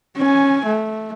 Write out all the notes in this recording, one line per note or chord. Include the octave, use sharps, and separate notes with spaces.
C#4 G#5
A3